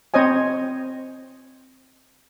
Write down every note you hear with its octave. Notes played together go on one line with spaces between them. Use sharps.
C4 C5 C#5 D#5 G#5